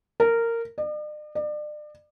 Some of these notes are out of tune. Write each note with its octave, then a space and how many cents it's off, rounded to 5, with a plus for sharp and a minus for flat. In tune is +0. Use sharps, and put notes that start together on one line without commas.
A#4 -15
D5 +45
D5 +35